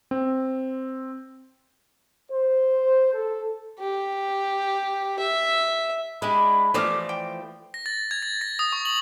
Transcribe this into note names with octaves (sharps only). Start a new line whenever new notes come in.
C4
C5
A4
G4
E5
G#3 D4 E4 G4 B5
E3 F3 A3 G4 D5 D6 F6
G5
A#6
A6
G#6
A6
A#6
D#6
C#6
F#7